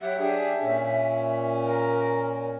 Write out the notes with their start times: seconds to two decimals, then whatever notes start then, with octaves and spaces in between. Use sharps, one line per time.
0.02 F#3 G4 E5 F#5
0.20 D4 G4 G#4
0.62 A#2 C#4
1.66 A#4